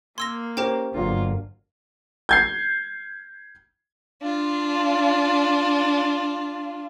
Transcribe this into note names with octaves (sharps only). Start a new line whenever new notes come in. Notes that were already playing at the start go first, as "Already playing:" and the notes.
A#3 C6 E6 G#6 A#6
C#4 G4 A#4 C5 G5
G1 F#3 A#3 D4 F4
G6 G#6 C7
D4 F4